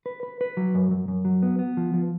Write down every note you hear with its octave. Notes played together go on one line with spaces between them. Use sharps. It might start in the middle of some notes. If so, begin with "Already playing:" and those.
B4
B4
B4
F#3
F#2
F#2
F#2
F#3
B3
B3
F3
F3